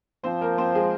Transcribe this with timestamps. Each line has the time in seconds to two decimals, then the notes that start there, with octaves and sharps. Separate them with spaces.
0.24 F3 C4 C5
0.41 A#3 A#4
0.58 C4 C5
0.75 G#3 G#4